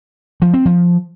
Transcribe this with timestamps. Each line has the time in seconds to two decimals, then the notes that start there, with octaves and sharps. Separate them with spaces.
0.42 F3
0.54 C4
0.66 F3